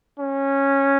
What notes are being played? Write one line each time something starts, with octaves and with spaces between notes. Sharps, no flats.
C#4